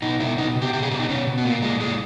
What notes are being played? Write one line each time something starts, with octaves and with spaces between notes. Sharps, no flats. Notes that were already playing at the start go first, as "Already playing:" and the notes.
B2 D#4
B2 E4
B2 D#4
B2
G4
B2 G4
G#4
B2 G4
D#4
B2 C#4
B2
B3
A#2 A#3
A#2 G#3
A#2 G#3